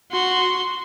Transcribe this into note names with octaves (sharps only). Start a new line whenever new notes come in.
F#4 C6